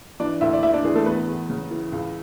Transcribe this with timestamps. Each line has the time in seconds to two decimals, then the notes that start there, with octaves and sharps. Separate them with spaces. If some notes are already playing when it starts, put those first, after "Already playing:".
0.20 E3 D4 D5
0.41 D2 E4 E5
0.53 D5
0.63 E3 E4 E5
0.73 D4 D5
0.84 E3 G#4
0.95 A3 A4
1.06 E2 B3 B4
1.28 E2
1.50 C#3
1.71 E3
1.92 C#2